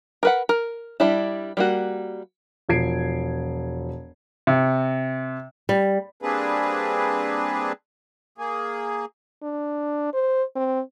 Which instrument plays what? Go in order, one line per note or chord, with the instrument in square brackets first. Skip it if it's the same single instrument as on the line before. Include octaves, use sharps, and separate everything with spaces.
[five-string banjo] A#4 B4 F#5
A#4
G3 D4 E4
G3 A#3 F#4
[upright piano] E1 F3 G#6 C7 D7
[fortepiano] C3
[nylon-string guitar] G3
[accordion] G3 A#3 C4 D4 G#4 B4
A#3 G#4
[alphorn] D4
C5
C4